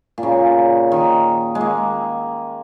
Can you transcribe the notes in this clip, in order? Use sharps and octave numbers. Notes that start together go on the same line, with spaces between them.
A#2
C#3
D#3
G#3
A#3